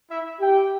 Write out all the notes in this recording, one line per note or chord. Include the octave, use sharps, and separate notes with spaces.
E4 E5
G4 G5